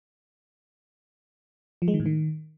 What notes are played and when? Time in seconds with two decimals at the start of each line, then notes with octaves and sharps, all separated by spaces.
1.82 F3
1.88 G#3
1.94 D#3
2.00 A2
2.06 D#3